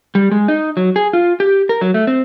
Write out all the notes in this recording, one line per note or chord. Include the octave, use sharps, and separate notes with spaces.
G3
G#3
D#4
F#3
G#4
F4
G4
A#4
F#3
A3
C4